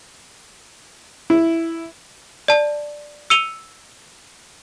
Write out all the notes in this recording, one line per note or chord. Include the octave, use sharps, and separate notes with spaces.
E4
D5 A5
E6 C#7 D#7 F7 G7